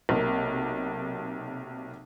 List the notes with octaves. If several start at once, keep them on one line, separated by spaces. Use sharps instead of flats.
B1 C3 A#3